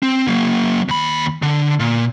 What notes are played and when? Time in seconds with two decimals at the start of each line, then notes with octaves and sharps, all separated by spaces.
0.03 C4
0.28 F#3 A#3
0.89 D#2 B5
1.42 D3
1.80 A#2